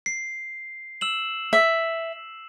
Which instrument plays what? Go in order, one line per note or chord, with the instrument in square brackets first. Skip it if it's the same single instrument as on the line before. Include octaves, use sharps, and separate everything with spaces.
[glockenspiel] C7
E6 E7 F#7
[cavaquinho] E5